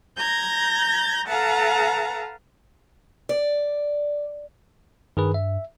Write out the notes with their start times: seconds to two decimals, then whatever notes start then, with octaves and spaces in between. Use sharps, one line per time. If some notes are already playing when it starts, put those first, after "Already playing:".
0.17 A#5 G6 G#6 A#6
1.28 A4 B4 F5 F#5 A5 A#5
3.29 D5
5.17 G2 D#3 G#4 B4
5.34 E5